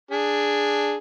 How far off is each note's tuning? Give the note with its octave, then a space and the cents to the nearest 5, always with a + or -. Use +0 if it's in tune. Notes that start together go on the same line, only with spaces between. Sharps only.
D4 +0 G#4 +0